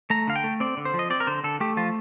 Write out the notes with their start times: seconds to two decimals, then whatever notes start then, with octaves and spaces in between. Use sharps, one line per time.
0.10 A3 A#5
0.27 D3 F5
0.36 G5
0.44 A3
0.60 C4 D5
0.77 D3
0.85 C5
0.94 F3
0.99 D#5
1.10 C4 D5
1.20 A#4
1.27 D3 C5
1.44 D3 A4
1.60 A3 G4
1.77 F3 F4